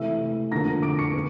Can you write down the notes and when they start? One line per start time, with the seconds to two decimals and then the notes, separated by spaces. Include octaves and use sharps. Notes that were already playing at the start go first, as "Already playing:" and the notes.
Already playing: C3 E3 A3 E5 E6
0.51 D3 F3 A#3 A#5 A#6
0.82 D6 D7
0.99 C#6 C#7
1.14 B3